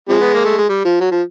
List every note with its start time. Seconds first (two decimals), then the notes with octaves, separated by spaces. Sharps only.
0.09 C3 F3 G#3
0.21 B3
0.34 A#3
0.45 A3
0.58 G#3
0.69 G3
0.85 F3
1.00 F#3
1.11 F3